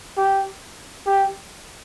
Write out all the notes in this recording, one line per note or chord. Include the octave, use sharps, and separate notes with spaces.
G4
G4